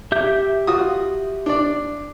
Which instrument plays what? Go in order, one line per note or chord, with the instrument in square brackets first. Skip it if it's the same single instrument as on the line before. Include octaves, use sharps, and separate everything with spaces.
[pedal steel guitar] G4 E5 G6
[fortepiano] F4 F#4 D#6
D4 D5